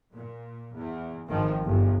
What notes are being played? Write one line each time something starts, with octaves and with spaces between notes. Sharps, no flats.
A#2
E2
G#1 D#3 F3
G1 E2